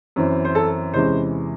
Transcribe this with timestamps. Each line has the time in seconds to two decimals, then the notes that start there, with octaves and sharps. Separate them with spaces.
0.16 F#2 E3 C4
0.45 C5
0.55 A4
0.94 E2 C3 E3 G#3 C#4 C5